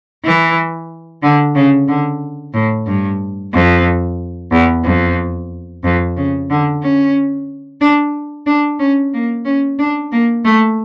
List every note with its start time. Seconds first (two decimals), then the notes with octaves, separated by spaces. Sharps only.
0.24 E3
1.23 D3
1.55 C#3
1.88 D3
2.54 A2
2.87 G2
3.53 F2
4.52 E2
4.84 F2
5.84 F2
6.17 C#3
6.50 D3
6.82 C#4
7.81 D4
8.47 D4
8.79 C#4
9.14 A#3
9.45 C#4
9.79 D4
10.12 A#3
10.44 A3